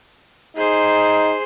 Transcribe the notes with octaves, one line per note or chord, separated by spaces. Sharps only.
D#4 G#4 C5